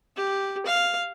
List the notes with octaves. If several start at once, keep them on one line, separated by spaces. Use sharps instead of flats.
G4
F5